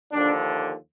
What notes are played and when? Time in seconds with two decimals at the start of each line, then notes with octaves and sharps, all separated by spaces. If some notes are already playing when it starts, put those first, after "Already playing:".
0.12 D#2 D3 F3 D4